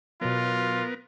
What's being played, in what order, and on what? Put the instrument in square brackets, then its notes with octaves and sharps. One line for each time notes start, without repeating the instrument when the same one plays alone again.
[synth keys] B2 F#3 [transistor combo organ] B3 A#4 [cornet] F4